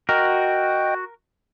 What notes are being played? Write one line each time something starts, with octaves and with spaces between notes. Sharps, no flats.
F#4 A#4 D#5 G5